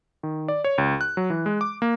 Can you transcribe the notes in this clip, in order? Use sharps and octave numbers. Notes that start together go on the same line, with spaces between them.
D#3
D5
C#5
C#2
F#6
F#3
E3
G#3
D6
A#3